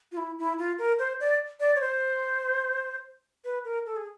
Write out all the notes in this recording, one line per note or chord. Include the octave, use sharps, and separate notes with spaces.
F4
E4
E4
F4
A#4
C5
D5
D5
C#5
C5
B4
A#4
A4
G#4